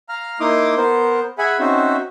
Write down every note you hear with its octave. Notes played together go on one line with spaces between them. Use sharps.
F5 A#5 F6
A#3 D#4 E4 C6 D6 D#6
B3 A#4 C5
G#4 E5 F#5 G#5 B5
C4 C#4 D#4 F#4 C5 E5